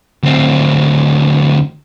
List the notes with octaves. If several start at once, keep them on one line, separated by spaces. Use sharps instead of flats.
D2 C4